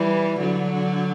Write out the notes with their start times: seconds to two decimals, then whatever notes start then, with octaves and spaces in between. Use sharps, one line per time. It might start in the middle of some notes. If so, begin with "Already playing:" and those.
Already playing: E3 G3
0.39 D3 F#3